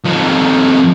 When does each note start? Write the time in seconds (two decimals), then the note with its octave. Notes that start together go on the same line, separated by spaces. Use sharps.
0.05 F2 D#3